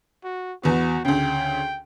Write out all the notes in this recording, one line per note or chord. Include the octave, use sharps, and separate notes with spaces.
F#4
E2 B3 F#4
D2 C#3 G5